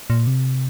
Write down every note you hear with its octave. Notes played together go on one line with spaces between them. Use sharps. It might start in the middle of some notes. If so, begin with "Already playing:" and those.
A#2
C3